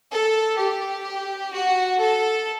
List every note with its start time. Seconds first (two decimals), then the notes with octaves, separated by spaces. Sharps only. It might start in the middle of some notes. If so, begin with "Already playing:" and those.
0.11 A4
0.57 G4
1.52 F#4
1.99 A4